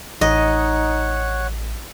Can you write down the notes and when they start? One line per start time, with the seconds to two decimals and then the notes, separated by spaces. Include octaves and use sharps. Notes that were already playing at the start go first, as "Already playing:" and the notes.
0.21 A1 D#4 C#5 D#5 F#5